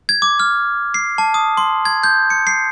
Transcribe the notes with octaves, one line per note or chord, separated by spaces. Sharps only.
G#6
D6
F6
C7
A5
D#6
C6
G#6
G6
C#7
C7